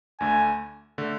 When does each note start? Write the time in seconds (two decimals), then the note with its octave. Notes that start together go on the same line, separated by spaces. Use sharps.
0.20 D2 D3 A3 G#5
0.98 D3 A3